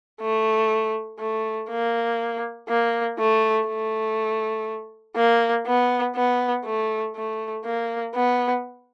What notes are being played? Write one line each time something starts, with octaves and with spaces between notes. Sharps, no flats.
A3
A3
A#3
A#3
A3
A3
A#3
B3
B3
A3
A3
A#3
B3